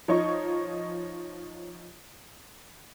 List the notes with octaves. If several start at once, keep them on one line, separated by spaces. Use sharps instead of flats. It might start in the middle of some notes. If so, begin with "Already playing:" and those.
F3 D#4 C#5 D#5 C#6